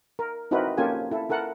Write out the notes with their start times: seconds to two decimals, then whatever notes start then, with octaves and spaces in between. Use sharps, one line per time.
0.19 A#4
0.51 C4 D#4 E4 F#4 A#4 B4
0.77 A#3 C#4 F4 G4 A4 G#5
1.11 E4 A4
1.29 E4 A4 A#4 F#5